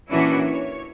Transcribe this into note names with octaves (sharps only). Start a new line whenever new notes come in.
A#2 E3 C#4 D4 E4 F#4
C#5